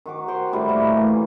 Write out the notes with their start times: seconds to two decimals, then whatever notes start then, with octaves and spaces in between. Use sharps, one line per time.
0.06 D#3 F#4 D6
0.28 C5 F#5 G5 C6
0.53 A2 G3 E4
0.69 A2 A#3
0.93 A2 E3
1.07 D#3